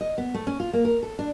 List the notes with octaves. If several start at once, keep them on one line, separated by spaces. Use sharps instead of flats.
D#5
B3
A3
C#4
F4
A#3
A#4
A4
D4